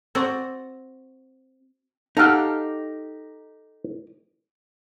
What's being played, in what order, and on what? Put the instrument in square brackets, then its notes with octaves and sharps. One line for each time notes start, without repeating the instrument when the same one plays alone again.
[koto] C4 F#4 D5
[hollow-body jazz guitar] D#4 G4 [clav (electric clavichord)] A4 F5 F#5